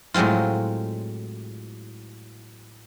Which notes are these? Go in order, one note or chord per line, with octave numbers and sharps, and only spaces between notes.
A2 F#3 G#3 C4 F4